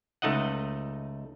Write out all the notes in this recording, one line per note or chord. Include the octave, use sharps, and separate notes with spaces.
C#2 A3 D#4 D#5 F#5